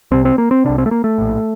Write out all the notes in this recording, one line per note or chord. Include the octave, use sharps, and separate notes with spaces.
C2 C3 C4
C4
A#3
C4
C2 C3 D4
C4
A3
A#3
A3
A#1 A2